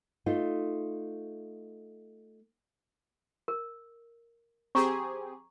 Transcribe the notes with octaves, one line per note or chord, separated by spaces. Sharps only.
A3 D#4 F4
A#4
C4 G4 G#4 A#5 C#6